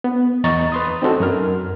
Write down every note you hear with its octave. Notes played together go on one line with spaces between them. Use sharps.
B3
E2 D#5 A#5 C#6 A6
B4 C6 D#6
C4 D#4 F#4 A4
F#2 A#4 F6